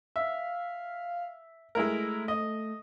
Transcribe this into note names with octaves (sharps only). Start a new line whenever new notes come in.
E5 F5
G#3 A3 E4 A#4
D#5